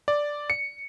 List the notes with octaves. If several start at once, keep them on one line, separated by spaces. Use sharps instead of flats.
D5
C#7